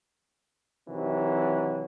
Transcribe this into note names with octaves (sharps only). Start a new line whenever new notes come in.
C3 D#3 E3 F#3